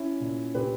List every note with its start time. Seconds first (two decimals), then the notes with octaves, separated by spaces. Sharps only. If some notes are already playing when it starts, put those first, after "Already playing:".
Already playing: C#4 E4
0.20 A#2
0.55 A#2 G4 B4